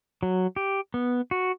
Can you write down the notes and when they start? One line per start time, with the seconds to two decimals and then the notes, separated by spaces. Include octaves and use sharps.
0.23 F#3
0.56 G4
0.94 B3
1.31 F#4